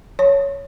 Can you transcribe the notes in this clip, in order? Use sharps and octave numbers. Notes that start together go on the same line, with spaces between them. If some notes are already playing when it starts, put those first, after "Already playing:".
C#5